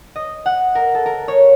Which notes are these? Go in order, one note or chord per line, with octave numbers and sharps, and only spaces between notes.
D#5
F#5
A#4
A4
A#4
C#5